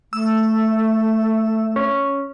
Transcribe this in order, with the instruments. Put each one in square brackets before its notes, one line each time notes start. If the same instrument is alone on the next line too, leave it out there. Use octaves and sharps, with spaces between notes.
[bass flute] A3 [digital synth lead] E6
[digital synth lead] C#4